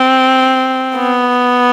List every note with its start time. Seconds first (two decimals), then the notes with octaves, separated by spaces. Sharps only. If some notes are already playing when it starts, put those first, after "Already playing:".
Already playing: C4
0.96 B3